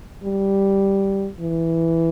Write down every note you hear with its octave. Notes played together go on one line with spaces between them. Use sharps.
G3
E3